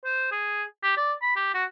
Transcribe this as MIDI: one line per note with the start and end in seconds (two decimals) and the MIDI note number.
0.05 0.29 72
0.32 0.64 68
0.84 0.95 67
0.97 1.13 74
1.22 1.36 83
1.36 1.52 67
1.54 1.64 66